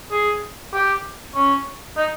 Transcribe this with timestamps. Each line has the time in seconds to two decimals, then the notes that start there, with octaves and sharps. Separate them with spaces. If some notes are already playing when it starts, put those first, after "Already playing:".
0.11 G#4
0.73 G4
1.35 C#4
1.97 D#4